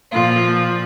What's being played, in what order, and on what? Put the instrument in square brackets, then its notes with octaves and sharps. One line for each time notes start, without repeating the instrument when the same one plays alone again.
[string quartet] A#2 F3 F4